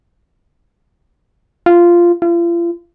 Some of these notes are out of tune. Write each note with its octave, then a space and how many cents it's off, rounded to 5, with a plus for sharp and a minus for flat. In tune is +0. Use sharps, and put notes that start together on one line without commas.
F4 -10
F4 -40